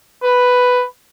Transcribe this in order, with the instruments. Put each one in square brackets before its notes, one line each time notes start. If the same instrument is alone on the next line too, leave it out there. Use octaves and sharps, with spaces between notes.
[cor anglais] B4